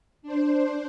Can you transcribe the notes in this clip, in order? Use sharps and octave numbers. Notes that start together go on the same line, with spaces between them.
D4 C5